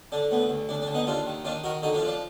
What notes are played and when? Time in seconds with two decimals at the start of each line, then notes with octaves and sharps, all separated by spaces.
0.12 D3 D4
0.31 D2 B3
0.50 D2
0.69 D2 D4
0.82 D4
0.88 D3
0.94 B3 D#4
1.07 D#2 D4 F4
1.26 D#3
1.45 D#3 D4 F4
1.63 D#3 F#4 A#4
1.82 D3 D#4 F#4
1.95 D4 F4
2.02 F3
2.07 D4